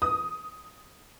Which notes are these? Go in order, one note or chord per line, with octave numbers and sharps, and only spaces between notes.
D#6